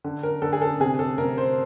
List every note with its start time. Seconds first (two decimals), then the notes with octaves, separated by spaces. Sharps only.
0.04 D3
0.23 A#4
0.42 D3 A4
0.53 G#4
0.62 A4
0.80 C3 G#4
0.99 A4
1.18 C3 A#4
1.38 C5